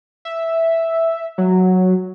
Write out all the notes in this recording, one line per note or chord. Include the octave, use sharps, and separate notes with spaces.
E5
F#3